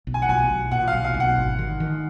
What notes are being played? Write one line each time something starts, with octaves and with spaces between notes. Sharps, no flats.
B1
G#5
F#5
B1 G#5
B1
A#2 F#5
F5
B1
F5
B1
F#5
G#1
D#3
D#3